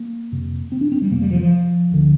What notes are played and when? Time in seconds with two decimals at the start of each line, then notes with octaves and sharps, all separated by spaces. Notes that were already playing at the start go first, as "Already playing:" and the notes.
Already playing: A#3
0.32 F2 C3
0.72 C4
0.81 D4
0.92 C4
1.02 G3
1.11 F2 C3 A#3
1.21 G3
1.31 F3
1.41 F3
1.91 D2 D3